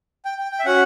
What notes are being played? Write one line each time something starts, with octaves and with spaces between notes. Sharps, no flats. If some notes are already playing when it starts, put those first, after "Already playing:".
G5
G5
G5
E5
C#4 F#4 F#5